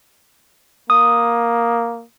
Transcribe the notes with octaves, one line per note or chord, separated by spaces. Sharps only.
A#3 D#6